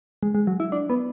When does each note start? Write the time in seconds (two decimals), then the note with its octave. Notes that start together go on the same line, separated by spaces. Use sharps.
0.23 G#3
0.35 G#3
0.47 F#3
0.60 E4
0.72 D4
0.90 B3